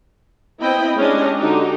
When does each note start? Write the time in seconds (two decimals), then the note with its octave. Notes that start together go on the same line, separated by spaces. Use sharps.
0.60 B3 C4 E4 D#5 G5 B5
0.97 G#3 C#4 D4 G4 D#5
1.39 D3 D#4 F#4 G4